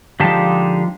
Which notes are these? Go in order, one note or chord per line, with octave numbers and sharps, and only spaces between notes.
D3 F3 G#3 D#4 G4 A5